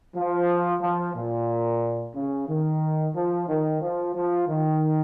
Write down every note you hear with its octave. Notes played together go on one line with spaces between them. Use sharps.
F3
F3
A#2
C#3
D#3
F3
D#3
F3
F3
D#3